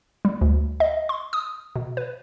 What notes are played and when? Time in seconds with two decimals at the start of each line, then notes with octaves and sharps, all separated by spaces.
0.25 G3
0.41 D2
0.80 D#5
1.09 C6
1.33 D#6
1.76 B2
1.97 B4